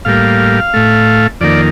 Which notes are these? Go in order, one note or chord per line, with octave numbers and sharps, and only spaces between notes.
A2 G3 A#3 F5
A2 A3
F2 D#3 A#3 D5